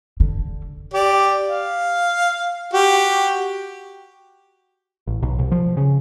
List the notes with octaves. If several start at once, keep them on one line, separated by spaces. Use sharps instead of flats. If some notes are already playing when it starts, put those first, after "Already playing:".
D3
G4 D5
F5
F#4 G4
A1
B1
C2
F3
C#3